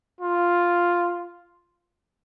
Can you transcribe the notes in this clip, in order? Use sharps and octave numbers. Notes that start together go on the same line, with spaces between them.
F4